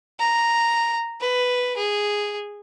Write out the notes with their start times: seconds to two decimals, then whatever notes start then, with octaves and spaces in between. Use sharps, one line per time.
0.20 A#5
1.21 B4
1.76 G#4